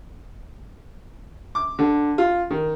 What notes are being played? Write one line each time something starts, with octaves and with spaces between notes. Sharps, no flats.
D6
D3
F4
D#3